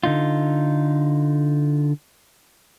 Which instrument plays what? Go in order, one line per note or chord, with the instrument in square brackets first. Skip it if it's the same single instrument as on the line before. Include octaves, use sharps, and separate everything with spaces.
[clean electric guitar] D3 D#4 F4